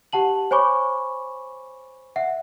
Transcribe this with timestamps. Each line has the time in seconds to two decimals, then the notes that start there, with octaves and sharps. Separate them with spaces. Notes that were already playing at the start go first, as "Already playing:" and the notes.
0.13 G4 F#5 A5 F#7
0.51 C5 C#5 G#5 B5 C#6 D6
2.16 E5 F#5